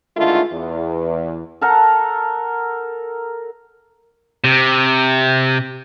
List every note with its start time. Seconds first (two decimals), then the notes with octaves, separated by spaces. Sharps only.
0.17 D3 D#3 G#3 A3 E4 F4
0.53 E2
1.61 A4 A#4 F#5
4.44 C3